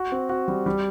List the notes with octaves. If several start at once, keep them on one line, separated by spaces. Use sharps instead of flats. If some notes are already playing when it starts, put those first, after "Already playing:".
Already playing: F#4
C4
F#4
G3
G3